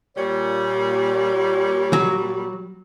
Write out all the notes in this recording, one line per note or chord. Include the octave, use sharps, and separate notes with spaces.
A#2 G3 C#5
F#3